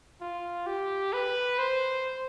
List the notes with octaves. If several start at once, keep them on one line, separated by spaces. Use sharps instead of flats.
F4
G4
B4
C5